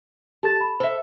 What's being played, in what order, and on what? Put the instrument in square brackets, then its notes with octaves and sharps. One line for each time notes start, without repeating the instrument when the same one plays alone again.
[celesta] G4 A4 A6 [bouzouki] A5
[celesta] B5
[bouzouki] A4 E5 [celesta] C5